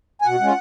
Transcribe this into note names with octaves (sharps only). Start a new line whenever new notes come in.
G#5
B2 F#5
G#3 C#4 F4